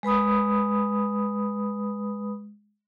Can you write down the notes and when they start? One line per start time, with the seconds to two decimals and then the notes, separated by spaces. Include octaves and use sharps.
0.03 G#3 B4 B5 D#6